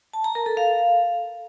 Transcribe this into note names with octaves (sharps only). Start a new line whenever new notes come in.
A5
A#5
A#4
A4
F5